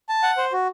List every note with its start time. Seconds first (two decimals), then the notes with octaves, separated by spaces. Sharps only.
0.09 A5
0.23 F#5
0.37 C5
0.52 F#4